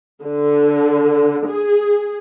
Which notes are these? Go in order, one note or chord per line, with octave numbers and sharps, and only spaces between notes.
D3
G#4